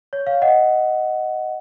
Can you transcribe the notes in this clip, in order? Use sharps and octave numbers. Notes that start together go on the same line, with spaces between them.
C#5
C#5 F5
D#5 F#5